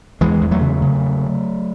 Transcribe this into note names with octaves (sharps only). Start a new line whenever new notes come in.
E2 E3 G#3
E2
F#3 A3
C#3
C#3